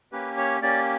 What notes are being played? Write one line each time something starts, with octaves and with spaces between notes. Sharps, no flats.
A#3 C#4 G4 B4
C#5
A#3 C#4 G4 D5